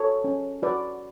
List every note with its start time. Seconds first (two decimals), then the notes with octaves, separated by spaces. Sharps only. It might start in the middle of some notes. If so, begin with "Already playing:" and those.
Already playing: F#4 A4 C#5
0.24 C#4
0.62 F#4 B4 D5